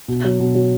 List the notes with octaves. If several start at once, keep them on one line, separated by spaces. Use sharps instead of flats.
B2
F#3
B2
F#3